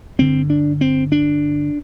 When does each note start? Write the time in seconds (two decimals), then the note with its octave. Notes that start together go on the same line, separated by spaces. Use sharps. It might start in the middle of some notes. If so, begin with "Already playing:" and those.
0.19 G2 D3 C4
0.50 D4
0.81 C4
1.12 D4